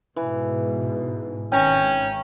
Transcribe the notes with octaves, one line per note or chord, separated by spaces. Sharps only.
G#2 B2 E3
G#1 C#4 G5 A#5